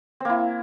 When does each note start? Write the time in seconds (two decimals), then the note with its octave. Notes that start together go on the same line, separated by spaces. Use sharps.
0.20 C4
0.25 A#3
0.29 E4